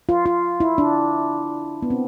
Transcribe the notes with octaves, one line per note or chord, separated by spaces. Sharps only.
F4
F4
E4
D4
B3
C4